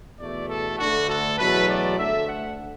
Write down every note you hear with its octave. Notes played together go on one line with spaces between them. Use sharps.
E2 B2 A3 D5
A4
D2 D3 A3 F#4
A4
E2 B2 F#3 A3 B4
D5
D2 D3 A3 E5
F#5